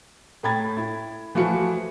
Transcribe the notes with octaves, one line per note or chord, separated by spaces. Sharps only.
A2 A3 G5 B5 G#6 A6
E4
E3 F3 A3 E4 F#4 C#7